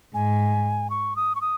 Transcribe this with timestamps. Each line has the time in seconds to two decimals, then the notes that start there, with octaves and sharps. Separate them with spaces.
0.14 G#2 G#5
0.90 C#6
1.16 D#6
1.35 C#6
1.41 D#6